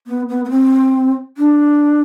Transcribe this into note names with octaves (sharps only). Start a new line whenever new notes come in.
B3
B3
B3
C4
D4